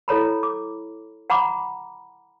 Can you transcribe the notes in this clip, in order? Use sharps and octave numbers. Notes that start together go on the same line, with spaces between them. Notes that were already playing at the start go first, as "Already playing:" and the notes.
E4 A4 C#5 A#5 B5
D6
F#5 A#5 B5 D6